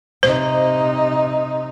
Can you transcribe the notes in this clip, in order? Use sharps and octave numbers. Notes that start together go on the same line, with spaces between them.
C3 D#4 C5